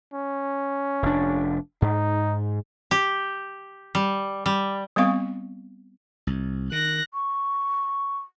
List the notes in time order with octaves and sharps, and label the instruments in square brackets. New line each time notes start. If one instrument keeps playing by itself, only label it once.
[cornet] C#4
[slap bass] F1 D4
[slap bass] G#2 [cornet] D#4
[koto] G4
G3
G3
[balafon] G3 B3 C4 F5 C#6
[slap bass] C2
[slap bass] D#3 [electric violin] F#6 A#6
[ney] C#6